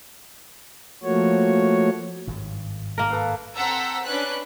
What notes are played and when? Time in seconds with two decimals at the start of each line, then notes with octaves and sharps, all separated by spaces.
1.04 F3 A3 A#3 F#4 C#5
2.27 G#1 G2
2.98 A#3 A#4
3.10 A4 B4 F5
3.55 C4 A4 F#5 A#5 E6 B6
4.02 C#4 D4 B4 F#6